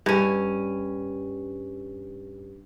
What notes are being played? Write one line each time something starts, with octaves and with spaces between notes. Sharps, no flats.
G2 C#4